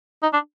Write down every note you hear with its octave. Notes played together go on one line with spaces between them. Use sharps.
D#4
D4